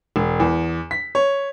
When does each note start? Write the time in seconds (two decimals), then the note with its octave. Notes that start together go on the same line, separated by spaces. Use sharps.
0.16 E1
0.40 E2
0.91 B6
1.15 C#5